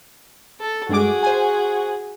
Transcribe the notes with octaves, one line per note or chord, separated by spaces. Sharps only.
A4
G2 G#3 F#4 G#4 D6
C5 G#5